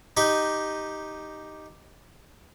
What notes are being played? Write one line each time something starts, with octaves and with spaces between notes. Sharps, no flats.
D#4 G4 D#5